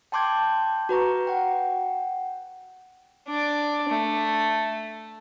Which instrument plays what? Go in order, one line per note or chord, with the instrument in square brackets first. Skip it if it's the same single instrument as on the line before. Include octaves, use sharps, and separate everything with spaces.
[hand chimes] G5 A5 C6 D6 G6 G#6
F#4 B4 A#5 C#6
F#5 G5
[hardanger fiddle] D4 D5
A3